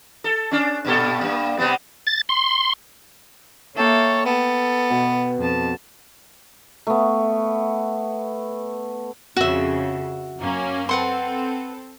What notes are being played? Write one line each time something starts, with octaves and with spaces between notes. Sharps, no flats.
A4
C#4 D4
G2 A#2 A4
G2 A#3
C3 G3 B3
A6
C6
A#3 A4 C#5 E5 G5
B3 A4
B2
F2 A5
A3 B3
F2 C#3 F#4 E5
F#2 A#3 C#4
C4 A4 B4 F#5 C6